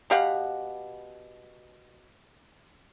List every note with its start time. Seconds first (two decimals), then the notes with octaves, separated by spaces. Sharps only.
0.10 B2 G4 F5 F#5